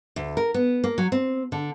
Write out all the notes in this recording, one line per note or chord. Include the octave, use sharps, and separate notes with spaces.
D2
A#4
B3
A#3
F#3
C4
D3